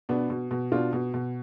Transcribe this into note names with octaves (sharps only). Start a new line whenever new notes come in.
B2 B3 D4
B2
B2
B2 D4 F4
B2
B2